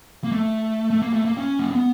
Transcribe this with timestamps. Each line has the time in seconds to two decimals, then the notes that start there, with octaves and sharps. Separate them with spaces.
0.24 A#3
0.32 A3
0.90 A3
1.02 A#3
1.13 A3
1.25 A#3
1.37 C#4
1.59 A#3
1.71 B3